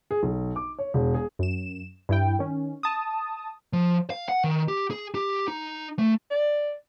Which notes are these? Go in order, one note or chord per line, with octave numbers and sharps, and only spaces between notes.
G#4
B1
D6
C#5
E1
G#4
F#2 E7
G2 E4 G5
D#3 C#4
A5 D#6
F3
F5
F#5
D#3
G4
G#4
G4
D#4
A3
D5